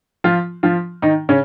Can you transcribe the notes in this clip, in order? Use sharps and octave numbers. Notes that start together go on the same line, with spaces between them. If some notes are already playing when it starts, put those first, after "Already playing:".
F3 F4
F3 F4
D#3 D#4
C#3 C#4